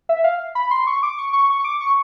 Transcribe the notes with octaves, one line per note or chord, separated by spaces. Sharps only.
E5
F5
B5
C6
C#6
D6
C#6
C#6
C#6
D6
C#6